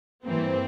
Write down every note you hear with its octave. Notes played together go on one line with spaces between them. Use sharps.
G2 E3 A#3 C4